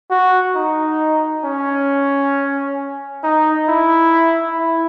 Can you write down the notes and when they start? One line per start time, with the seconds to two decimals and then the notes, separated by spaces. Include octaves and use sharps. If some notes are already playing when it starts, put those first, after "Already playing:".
0.10 F#4
0.56 D#4
1.45 C#4
3.24 D#4
3.69 E4
4.58 E4